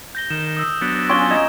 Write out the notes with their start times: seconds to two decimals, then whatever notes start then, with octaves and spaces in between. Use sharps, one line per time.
0.15 G6 A#6 G7
0.30 D#3 E7
0.57 D#6 E6
0.81 F#3 B3 D4
1.09 C#4 F4 G#5 D7 G7
1.31 D#5 A#5 G#6 E7